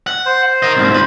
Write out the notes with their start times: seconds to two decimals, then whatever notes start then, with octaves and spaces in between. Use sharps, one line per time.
0.07 F#5
0.26 C5
0.63 A#4 D#5
0.77 C2 G#2
0.91 C#2 B4